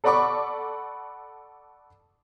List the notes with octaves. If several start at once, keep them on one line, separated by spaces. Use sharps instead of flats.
A4 D5 F#5 B5 C#6 D6